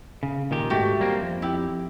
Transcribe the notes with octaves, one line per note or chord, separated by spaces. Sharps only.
C#3
A#2 D#3 G4
G#2 A3 F#4 G4
G3 A#3 C4
F2
E4 G4